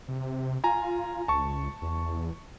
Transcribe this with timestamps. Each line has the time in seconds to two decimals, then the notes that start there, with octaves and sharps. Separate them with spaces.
0.08 C3
0.64 F4 G#5 A#5
1.28 C#2 A5 C#6
1.82 E2